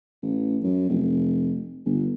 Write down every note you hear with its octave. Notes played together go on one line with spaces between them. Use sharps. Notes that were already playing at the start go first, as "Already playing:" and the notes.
A1
F#2
F1
G1